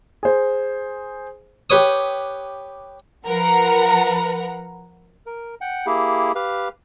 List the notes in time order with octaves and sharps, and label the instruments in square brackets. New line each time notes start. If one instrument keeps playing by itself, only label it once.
[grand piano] G#4 C5
[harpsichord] G4 B4 C#5 D#6
[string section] F3 A#4 B4 F#5 A#5
[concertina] A#4
F#5 G5
A#3 E4 G4 G#4
G4 B4 F5